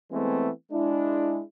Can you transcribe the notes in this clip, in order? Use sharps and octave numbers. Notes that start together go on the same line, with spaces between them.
E3 G#3 A3 B3 C4
G#3 D4 E4